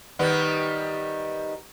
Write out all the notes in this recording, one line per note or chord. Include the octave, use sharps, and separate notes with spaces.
D#3 G3 B3